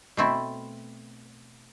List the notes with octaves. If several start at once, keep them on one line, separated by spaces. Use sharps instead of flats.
B2 A3 C4 E4